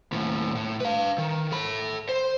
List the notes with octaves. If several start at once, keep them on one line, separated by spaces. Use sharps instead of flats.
D#2 A2
A2
B4 F5
D#3
A4 B5
C5